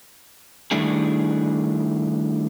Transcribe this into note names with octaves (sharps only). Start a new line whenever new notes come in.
D#3 G3 A3 D4 E4 G#4